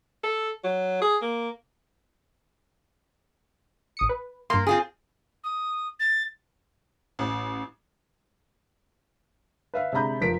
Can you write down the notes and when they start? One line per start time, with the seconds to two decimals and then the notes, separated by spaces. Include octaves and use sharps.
0.23 A4
0.64 F#3
1.01 G#4
1.21 A#3
3.97 A1 D#6 C#7
4.09 B4
4.50 G2 A#3 C6
4.67 C4 F4 G#4
5.44 D#6
6.00 A6
7.19 A1
9.74 B4 E5 F5
9.92 C3 G#3 D4 A#5 B5 G6
10.21 F1 F3 A#4 B4 B6 D7